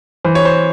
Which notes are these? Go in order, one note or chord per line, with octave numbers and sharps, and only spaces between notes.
E3 C5
C#5
C5